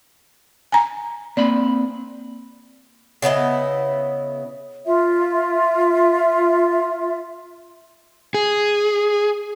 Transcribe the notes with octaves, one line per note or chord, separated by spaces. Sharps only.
G#5 A#5
A#3 C4 D5 B5
C#3 B3 E4 D#5
F4 E5
G#4